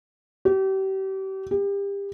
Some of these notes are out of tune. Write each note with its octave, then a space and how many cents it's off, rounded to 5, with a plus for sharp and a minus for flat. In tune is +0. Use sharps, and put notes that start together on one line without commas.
G4 -35
G4 +30